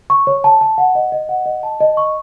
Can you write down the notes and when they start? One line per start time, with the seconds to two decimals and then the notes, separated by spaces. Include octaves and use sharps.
0.10 C#6
0.27 C#5
0.44 A5
0.61 A5
0.78 F#5
0.95 D#5
1.12 D#5
1.29 F#5
1.46 D#5
1.63 A5
1.80 D#5
1.97 C#6